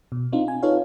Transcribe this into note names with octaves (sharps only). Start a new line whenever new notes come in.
B2
C4 D4 D#4 F4
G#5
D#4 F4 A4 B4 C#5 F5